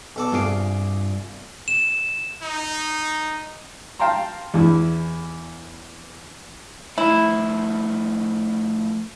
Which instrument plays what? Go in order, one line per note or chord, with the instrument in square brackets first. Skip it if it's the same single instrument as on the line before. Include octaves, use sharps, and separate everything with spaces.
[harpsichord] B1 A4 D5
[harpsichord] C2 G#4 F5 [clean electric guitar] G2 F4 D5
[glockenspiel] E7
[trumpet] D#4
[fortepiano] F5 G5 A5 A#5 C6
E2 E4
[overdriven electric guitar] A2 F3 [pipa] E4